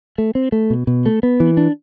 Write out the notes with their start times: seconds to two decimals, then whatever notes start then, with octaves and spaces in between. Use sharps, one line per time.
0.18 A3
0.35 C4
0.52 A3
0.70 B2
0.87 B2
1.06 A3
1.23 B3
1.40 E3
1.57 D4